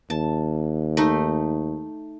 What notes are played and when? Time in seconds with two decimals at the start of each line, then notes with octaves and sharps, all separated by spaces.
0.10 D#2 A5
0.97 A3 D#4